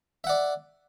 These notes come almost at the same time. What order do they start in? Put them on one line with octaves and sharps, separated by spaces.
E5 F#5 D5